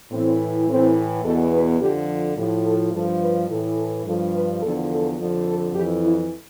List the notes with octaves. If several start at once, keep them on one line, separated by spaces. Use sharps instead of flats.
A2 E3 C4
A2 E3 C4
E2 B2 A4
B4
F2 D3 F3 G4
A2 F3 G4
A4
G2 F3 A4
B4
A2 E3 A4
A4
G2 F3 A4
B4
E2 D3 F3 A4
A4
F2 D3 F3
A4
F2 E3 G4
E4